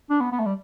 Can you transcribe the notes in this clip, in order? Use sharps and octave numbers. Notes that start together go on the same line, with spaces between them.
D4
B3
B3
A3
G3